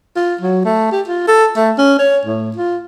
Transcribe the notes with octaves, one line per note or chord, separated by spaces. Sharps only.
F4
F#3
A3
G4
F4
A4
A3
C#4
C#5
A2
F4